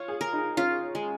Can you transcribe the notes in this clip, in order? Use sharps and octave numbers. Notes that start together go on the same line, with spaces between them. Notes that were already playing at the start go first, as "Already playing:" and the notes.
Already playing: F4 C#5
G#4
A#4
D#4
C#4 F4
G#3